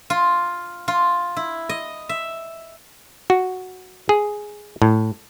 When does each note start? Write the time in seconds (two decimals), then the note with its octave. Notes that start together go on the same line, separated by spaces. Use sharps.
0.10 F4
0.88 F4
1.37 E4
1.69 D#5
2.09 E5
3.30 F#4
4.09 G#4
4.82 A2